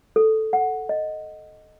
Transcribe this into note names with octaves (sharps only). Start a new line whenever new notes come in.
A4
F#5
D#5